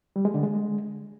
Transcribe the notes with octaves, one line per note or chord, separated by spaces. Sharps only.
G3
G#3
D3
G#3